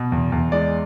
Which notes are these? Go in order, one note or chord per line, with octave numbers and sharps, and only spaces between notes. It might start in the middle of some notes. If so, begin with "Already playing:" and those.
Already playing: B2
E2
E2
G#3 D5